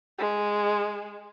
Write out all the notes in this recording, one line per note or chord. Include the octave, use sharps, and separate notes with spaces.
G#3